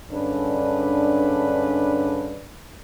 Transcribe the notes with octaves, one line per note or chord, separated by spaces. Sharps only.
G2 D3 G#3 C#4 D4 B4